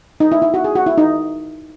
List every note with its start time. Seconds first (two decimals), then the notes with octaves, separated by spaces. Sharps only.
0.20 D#4
0.32 E4
0.42 E4
0.54 F#4
0.64 G#4
0.75 F#4
0.86 E4
0.98 D#4